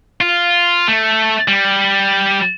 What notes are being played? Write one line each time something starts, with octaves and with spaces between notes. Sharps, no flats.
F4
A3
G3